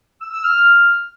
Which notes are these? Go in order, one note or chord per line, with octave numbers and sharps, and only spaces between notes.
E6
E6
F6